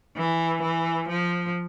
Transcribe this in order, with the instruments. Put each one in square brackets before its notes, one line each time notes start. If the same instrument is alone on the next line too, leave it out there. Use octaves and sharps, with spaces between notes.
[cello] E3
E3
F3